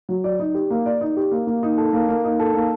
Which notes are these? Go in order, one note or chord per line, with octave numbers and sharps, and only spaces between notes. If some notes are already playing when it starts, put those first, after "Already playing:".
F#3
D5
D#4
G4
A#3
D5
D#4
G4
A#3
A#3
D#4
A4
A#3
A#3
D#4
A4
A#3